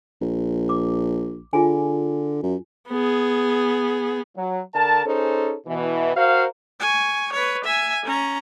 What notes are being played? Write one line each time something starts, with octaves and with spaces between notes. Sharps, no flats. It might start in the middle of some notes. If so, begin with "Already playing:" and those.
A#1
D6
D3 F4 G#4 G#5
F#2
B3 G#4
F#3
D3 A#4 A5
C#4 D#4 G#4 A4 C5
B2 E3
F#4 A#4 C5 F5
G#5 C#6
B4 C#5
E5 G#5
C#4 A#5